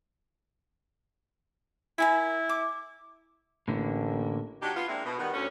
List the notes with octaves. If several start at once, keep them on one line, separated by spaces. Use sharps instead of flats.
E4 A#4 G#5 B5
D6
A1 A2 D3 A#3
F#3 D4 D#4 F#4 G4
B3 F4
G#3 A#3 C4 D4 E4 A#4
B2
D#3 G3 B3
D2 C#4